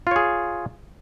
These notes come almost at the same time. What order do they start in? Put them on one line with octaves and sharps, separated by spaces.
F4 C#5 G#4